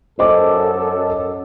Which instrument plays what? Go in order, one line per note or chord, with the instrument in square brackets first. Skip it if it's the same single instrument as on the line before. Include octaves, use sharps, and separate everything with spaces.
[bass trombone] F#2 [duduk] A4 [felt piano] C5 D#5 D6